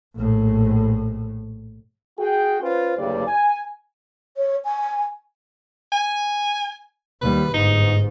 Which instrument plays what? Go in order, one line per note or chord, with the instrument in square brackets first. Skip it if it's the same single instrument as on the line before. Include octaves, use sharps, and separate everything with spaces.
[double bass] A#1 A2
[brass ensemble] F#4 G#4 G5
C#4 F4 B4 C5
F#1 D2 G2 C#3 G4 D5
G#5
[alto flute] C#5
G#5
[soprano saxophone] G#5
[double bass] D#2 G3 [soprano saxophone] B4
[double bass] G1 G#2 [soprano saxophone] D#4